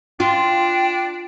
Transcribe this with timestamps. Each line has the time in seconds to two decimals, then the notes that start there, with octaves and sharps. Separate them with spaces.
0.20 D4 F4 G5